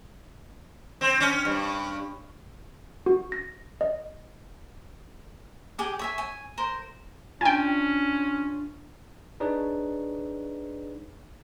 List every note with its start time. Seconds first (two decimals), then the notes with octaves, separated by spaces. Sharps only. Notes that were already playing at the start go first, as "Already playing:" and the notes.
1.01 C4
1.20 C#4
1.45 G2
3.06 F#4
3.32 A#6
3.81 D#5
5.78 G4 G#4 D6
5.99 C#5 E5 G#5
6.18 G#5
6.58 A#4 C5
7.41 C#4 D4 F4 G5 G#5
9.40 D4 D#4 G#4 B4 C#5 D5